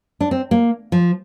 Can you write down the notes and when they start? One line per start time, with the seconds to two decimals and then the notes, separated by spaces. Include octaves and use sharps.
0.21 D4
0.31 C4
0.51 A#3
0.92 F3